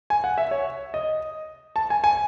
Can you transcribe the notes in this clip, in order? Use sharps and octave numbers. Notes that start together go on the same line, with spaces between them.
G#5
F#5
E5
C#5
D#5
A5
G#5
G#5